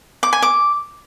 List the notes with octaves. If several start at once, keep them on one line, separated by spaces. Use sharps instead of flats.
D6
G#5
D6